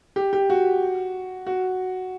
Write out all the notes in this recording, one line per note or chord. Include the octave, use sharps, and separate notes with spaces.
G4
G4
F#4
F#4